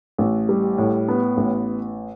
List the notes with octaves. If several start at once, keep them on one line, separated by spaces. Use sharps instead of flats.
A1
G3
A2
B3
A1